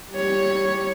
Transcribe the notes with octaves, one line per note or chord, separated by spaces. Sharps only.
G3 C#5